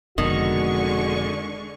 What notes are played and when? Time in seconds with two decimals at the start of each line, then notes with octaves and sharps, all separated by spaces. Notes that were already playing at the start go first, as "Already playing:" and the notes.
0.18 F1 F2 B2 D3 D#3 G#3 F#4 C#6